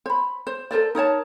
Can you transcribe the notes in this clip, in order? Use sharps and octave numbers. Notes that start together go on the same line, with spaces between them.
C5 B5
C5
A4 A#4 C5 D5
D#4 A#4 C#5 A5